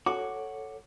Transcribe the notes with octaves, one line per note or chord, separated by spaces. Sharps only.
F#4 A4 C#5 D6